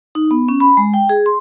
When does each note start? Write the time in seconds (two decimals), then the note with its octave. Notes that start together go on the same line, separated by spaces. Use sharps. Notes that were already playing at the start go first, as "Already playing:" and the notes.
0.15 D#4
0.31 B3
0.49 C#4
0.60 B5
0.77 G#3
0.94 G5
1.09 G#4
1.26 C6